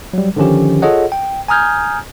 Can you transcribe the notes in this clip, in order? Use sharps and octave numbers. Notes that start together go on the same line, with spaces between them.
F#3 G3
D3 D#3 F3 C#4 G4
F4 G#4 A4 C#5 D#5 F#5
G5
G#5 A#5 D#6 F6 G6 G#6